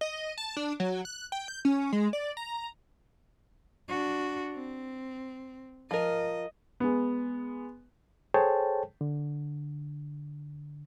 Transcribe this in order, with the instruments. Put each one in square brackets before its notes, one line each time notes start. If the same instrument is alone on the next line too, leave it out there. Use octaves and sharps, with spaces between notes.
[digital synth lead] D#5
A5
D4
F#3
F#6
G5
G6
C#4
G#3
D5
A#5
[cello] D4 F#4
C4
[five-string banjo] F3 A#4 [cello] D#5
[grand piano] G#3 B3
[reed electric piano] G#4 A4 C5 C#5 G5 A5
D3